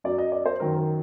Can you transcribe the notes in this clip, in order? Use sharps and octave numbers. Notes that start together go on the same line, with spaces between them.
F#2 F#3 D5
D#5
D5
C5
F#2 D#3 F#3 A#4
A#4